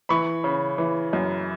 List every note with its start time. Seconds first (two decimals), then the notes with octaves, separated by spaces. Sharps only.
0.09 E3 B5 C#6
0.44 C#3
0.78 E3
1.13 F#2